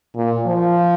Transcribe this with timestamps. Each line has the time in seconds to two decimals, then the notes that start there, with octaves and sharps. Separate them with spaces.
0.16 A#2
0.47 F3